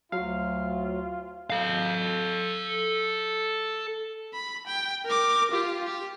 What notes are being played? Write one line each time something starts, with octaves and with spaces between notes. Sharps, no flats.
D2 F#3 F4 F5
A4 F5
B5
G5
A#4 D6
F4 G4
G4